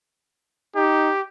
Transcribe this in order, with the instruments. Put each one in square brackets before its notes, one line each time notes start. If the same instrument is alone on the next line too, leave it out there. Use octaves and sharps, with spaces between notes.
[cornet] D#4 [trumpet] G4